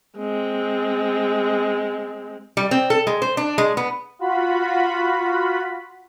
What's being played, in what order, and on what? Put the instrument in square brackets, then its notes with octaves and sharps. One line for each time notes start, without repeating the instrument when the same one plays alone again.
[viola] G#3 C4
[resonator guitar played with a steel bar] G3
C4
A4
G#3
C5
D4
G#3
B3
[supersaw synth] F4 F#4 B5